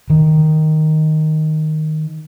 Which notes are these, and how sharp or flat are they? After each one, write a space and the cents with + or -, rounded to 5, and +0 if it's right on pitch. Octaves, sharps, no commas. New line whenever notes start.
D#3 +0